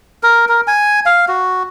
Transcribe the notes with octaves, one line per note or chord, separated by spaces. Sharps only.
A#4
A#4
G#5
F5
F#4